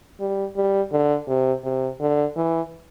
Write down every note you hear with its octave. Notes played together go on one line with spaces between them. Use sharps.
G3
G3
D3
C3
C3
D3
E3